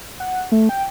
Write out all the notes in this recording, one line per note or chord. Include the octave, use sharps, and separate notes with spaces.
F#5
A3
G5